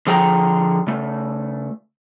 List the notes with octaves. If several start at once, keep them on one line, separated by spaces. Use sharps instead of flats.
D3 F3 G#4 G5 G#5 A#5
C#3 A3